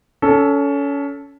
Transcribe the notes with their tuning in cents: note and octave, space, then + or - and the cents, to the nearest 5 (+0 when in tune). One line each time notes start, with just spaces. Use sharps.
C#4 +25 A4 +0